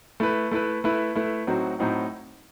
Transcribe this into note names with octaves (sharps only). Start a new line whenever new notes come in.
A3 E4 B4
A3 E4 B4
A3 E4 B4
A3 E4 B4
A2 F#3 C4 D#4 F#4
A2 F#3 C4 D#4 F#4